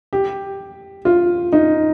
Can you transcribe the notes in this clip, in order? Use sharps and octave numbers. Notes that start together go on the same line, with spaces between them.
G4
F4
D#4